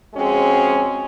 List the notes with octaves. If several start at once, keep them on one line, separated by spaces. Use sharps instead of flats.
F2 G#3 C4 C#4 F#4 G#4